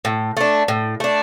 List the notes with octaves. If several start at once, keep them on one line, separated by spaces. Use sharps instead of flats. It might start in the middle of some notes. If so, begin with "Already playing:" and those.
A2
A3 D4
A2
A3 D4